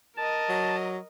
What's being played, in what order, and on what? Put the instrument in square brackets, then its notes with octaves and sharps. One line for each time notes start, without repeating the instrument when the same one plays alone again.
[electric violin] A#4 D#5 [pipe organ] A5
[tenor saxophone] F#3